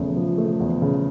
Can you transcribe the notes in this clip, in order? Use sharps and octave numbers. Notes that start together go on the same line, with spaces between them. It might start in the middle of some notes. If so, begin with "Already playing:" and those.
Already playing: E2 C#3 F3 A3
F3
A3
E2
C#3